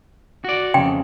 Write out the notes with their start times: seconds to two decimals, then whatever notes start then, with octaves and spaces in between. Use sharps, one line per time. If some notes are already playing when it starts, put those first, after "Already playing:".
0.44 F#4 D5
0.74 F2 C#3 G5